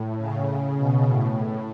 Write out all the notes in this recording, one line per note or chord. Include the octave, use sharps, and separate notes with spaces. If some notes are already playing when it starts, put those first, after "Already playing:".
Already playing: A2
C#3
B2
A2
A2